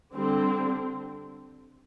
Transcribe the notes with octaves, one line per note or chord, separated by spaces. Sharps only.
D3 G3 C4